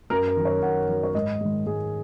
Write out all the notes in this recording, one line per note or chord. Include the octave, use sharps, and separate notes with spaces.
F#2 A#4
A#4
D#3 F#3
C#5
F#2 F#5
D#3 F#3
C#5
G#2 D#5
D#3 G#3
G#2 G#4